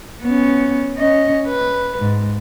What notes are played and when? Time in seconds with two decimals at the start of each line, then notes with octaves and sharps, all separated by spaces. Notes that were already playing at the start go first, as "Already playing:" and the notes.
0.23 B3 C#4
0.98 C#4 D#5
1.48 B4
1.99 G#2